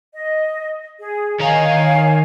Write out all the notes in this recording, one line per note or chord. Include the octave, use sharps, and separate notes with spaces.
D#5
G#4
D#3 C#5 F5 G#5 A#5